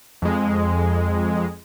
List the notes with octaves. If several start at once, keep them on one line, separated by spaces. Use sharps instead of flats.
F2 G#3